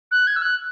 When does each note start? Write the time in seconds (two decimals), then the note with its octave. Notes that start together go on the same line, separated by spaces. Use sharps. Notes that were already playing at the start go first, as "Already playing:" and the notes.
0.11 F#6
0.27 G#6
0.36 E6
0.42 F#6